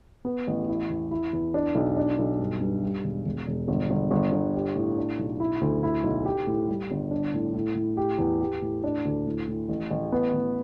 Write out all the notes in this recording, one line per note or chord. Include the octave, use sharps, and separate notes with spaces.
B3
A1
E4
E2
E4
E2
D4
B1
D4
B1
G2
G2
G3
E1
E1
E1
G1
G1
G1
G1
G4
A2
D4
B1
E4
D2
E4
B1
G4
A2
G3
G1
D4
A2
A2
A2
G4
E2
G4
A2
D4
D2
A2
A2
A1
A1
B3
A1